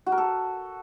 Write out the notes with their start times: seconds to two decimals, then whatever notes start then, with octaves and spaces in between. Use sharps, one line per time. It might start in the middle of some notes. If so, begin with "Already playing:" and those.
0.06 F#4
0.12 A#4
0.18 A4